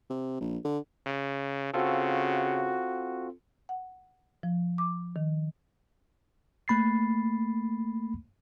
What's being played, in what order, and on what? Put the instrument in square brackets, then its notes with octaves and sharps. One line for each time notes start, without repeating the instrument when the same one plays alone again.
[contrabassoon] C3
A#1
D3
[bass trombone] C#3
[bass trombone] C#3 [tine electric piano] C4 F4 A4 [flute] F#4
[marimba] F#5
F3
D6
D#3
[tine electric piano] A3 A#3 B5 A6 C7